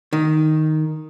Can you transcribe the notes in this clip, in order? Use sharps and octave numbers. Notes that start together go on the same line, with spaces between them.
D#3